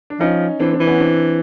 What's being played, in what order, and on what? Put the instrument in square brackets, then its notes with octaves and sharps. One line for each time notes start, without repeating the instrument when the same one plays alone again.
[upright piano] D4
[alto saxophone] F3 [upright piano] C#4 D#4
[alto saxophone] E3 [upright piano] C4 D4
[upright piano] C4 D4
[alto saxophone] E3
[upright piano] B3 C#4
C4 D4